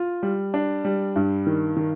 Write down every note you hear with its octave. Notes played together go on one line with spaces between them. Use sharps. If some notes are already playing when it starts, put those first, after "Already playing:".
Already playing: F4
G3
D4
G3
G2
D#3
D#3